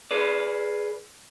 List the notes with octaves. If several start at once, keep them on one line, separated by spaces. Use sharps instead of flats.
G#4 B4 D5